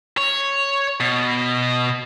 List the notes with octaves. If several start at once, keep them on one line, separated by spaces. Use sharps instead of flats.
C#5
B2